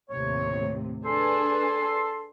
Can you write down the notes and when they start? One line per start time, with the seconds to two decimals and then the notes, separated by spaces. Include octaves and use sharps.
0.10 D#2 A2 C3 C#5
1.05 D4 G#4 A4 B4 C6